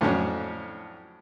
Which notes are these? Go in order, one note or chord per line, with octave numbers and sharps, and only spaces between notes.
F2 A2 F#3 C#4 D4